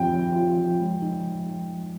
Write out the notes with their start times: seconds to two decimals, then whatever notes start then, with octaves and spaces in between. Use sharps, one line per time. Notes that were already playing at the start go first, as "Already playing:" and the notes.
Already playing: F3 C4 F4 G5
0.13 F3
0.36 F4
0.58 F3
0.80 G#3
1.02 D#4